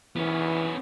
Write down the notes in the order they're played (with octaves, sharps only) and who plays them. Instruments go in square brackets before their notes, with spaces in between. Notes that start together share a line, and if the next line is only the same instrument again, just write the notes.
[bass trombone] E3 [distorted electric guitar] B3 C#4